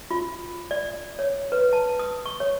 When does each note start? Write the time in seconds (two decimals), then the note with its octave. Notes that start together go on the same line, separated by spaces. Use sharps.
0.11 F4
0.71 D5
1.19 C#5
1.52 B4
1.73 A5
1.99 D#6
2.26 C#6
2.40 C#5